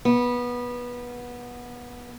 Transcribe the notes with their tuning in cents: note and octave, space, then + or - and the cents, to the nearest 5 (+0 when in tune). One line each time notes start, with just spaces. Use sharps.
B3 -20